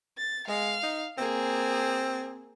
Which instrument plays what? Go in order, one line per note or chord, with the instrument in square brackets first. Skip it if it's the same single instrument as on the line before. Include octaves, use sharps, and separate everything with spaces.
[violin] A6
[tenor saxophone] G#3 [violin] F5
[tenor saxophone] D#4
[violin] A#3 G#4 [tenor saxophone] C4